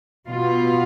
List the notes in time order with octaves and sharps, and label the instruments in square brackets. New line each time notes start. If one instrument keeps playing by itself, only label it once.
[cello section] B2 F4